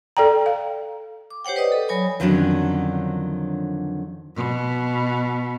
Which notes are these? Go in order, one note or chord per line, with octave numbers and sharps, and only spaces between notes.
A4 D5 G5 A#5
F5
D6
G4 C5 C#5 F#5 G5
B4 D5 D#5 D#6
A4
F#3 C#5 G#5 B5 D#6
F2 D3 D#3 F#3 C#4 D4
B2